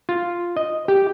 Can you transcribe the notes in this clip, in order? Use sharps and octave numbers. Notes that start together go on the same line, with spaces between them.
F4
D#5
G4